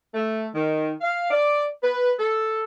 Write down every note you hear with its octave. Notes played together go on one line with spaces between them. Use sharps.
A3
D#3
F5
D5
B4
A4